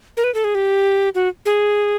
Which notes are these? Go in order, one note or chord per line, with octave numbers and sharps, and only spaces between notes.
A#4
B4
A4
G#4
G4
F#4
G#4